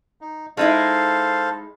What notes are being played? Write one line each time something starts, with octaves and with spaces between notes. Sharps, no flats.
D#4
G#3 D#4 E4 A4 C5 F5